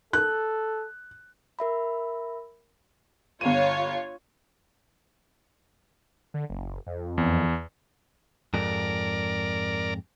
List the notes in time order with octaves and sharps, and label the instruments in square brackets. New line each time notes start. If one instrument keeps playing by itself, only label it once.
[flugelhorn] A4 [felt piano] F#6
[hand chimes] A#4 E5 B5
[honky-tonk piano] G1 D#7 [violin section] F4 C#5
[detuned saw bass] D3
F#1
F2
[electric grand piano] E2
[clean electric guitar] F2 G#2 [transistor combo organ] A#4 D5